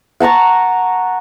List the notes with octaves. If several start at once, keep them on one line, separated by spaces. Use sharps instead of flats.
F#5 A5 A#5 C#6